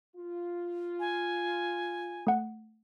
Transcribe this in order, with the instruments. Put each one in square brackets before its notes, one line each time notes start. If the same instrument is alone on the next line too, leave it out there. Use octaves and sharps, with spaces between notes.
[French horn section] F4
[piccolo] G#5
[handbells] A3 F#5